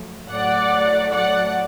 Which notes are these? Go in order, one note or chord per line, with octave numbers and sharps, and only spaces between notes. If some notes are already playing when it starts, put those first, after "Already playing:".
Already playing: F#2 F3 A3
A2 F#3 A3 D5 F#5
D5 F#5